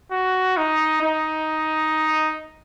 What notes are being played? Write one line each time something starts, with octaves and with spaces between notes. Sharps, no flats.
F#4
D#4
D#4